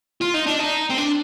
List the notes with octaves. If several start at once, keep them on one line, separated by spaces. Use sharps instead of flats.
F4
D#4
D4
D#4
C4
D4